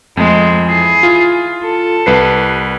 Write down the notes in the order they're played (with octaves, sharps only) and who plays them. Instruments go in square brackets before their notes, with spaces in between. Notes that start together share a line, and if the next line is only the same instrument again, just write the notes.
[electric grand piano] F2 [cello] G#3
[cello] E3 G#4
[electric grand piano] F4
[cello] A4
[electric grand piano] C2 B4 C7